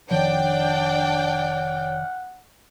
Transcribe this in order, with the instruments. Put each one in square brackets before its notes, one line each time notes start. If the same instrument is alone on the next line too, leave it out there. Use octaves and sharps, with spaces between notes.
[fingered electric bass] F1 D#3 F3 [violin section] D4 D5 G5 [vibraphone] C#5 [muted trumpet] F#5